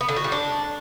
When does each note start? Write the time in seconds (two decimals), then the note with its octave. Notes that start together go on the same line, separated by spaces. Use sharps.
0.01 B3
0.08 D3
0.16 F#4
0.24 G3
0.32 D4